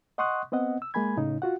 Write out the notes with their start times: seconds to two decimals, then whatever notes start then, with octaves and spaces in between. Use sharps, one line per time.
0.18 D#5 F#5 C6 C#6 D#6 F#6
0.52 B3 C4 D#5 F#5
0.82 E6
0.94 G#3 A#3 G#5 B5 G#6
1.17 A2 C#3 D#4
1.42 F4 F#4 F#5